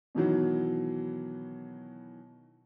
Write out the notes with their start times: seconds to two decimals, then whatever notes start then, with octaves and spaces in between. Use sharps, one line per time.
0.15 B2 D#3 E3 F#3